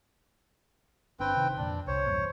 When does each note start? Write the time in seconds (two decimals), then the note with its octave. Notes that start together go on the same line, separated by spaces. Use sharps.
1.20 G1 C4 D4 B4 G5
1.37 C3 D#3
1.57 F2 A#2 D3 D4
1.87 C2 C5 C#5
2.06 E2 G2 A#2